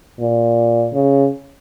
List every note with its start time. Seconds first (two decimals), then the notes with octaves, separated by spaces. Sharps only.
0.20 A#2
0.94 C#3